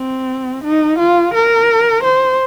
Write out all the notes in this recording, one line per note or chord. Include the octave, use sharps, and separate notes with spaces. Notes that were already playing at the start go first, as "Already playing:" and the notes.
Already playing: C4
D#4
F4
A#4
C5